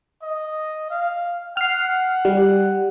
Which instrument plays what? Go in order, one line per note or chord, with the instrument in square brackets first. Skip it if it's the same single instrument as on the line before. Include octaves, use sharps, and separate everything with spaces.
[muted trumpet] D#5
F5
[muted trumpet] F#5 [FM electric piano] F6 C7
[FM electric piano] G3